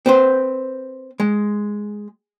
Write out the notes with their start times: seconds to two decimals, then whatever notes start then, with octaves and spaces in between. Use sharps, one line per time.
0.06 C4 B4 C5
1.20 G#3